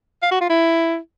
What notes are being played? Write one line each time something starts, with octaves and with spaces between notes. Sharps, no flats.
F5
F#4
F4
E4